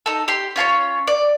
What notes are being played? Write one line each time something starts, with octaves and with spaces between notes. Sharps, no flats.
D#4 A4
G4 C6
C#4 F4 A4 C#5
D5